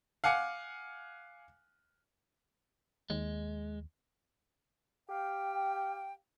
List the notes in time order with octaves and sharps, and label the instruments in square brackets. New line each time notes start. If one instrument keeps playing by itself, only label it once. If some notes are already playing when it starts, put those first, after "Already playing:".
[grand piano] F5 F#5 G#5 D6 C#7
[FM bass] D#2 [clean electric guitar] G#3
[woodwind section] G4 F5 G5